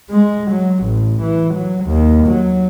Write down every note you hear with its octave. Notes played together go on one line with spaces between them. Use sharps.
G#3
F#3
A1
E3
F#3
D#2
F#3